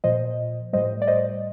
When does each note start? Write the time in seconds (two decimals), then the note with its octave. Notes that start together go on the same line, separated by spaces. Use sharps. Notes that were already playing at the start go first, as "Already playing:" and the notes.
0.04 A#2 F3 C5 D#5
0.73 A2 G3 C5 D#5
1.02 D5
1.08 C5 D#5